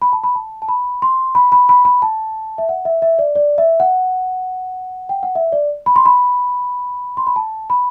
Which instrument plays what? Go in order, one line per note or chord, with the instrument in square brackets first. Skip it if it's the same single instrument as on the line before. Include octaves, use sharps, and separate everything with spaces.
[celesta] B5
A5
B5
A5
A5
B5
C6
B5
B5
B5
B5
A5
E5
F#5
E5
E5
D5
D5
E5
F#5
G5
F#5
E5
D5
B5
C6
B5
C6
B5
A5
B5